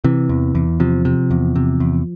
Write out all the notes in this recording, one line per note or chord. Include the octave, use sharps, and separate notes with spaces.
C3 E3
E2
E2
C3 F3
C3
E2
C3
E2